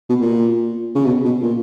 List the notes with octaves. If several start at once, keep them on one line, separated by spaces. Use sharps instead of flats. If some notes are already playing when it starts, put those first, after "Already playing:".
B2
A#2
C#3
B2
B2
A#2